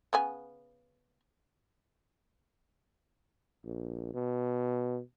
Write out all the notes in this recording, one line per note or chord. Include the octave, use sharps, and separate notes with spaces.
C#3 B3 G#5
A#1
B2